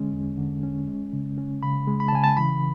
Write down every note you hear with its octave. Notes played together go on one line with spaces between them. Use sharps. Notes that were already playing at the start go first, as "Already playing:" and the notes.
Already playing: D3 G#3 C#4
E2
D3
C#4
G#3
C#3
C#4
C#3 B5
G#3
B5
A5
C#3 G#5
A5
E3 B5